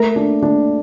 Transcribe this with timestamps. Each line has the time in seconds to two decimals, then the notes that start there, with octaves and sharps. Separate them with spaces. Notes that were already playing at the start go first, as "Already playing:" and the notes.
Already playing: A3 A#4
0.16 D4
0.42 D4